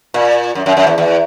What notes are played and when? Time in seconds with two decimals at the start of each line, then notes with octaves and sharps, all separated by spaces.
0.14 A#2
0.55 F#2
0.66 F#2
0.77 F#2
0.87 E2
0.98 E2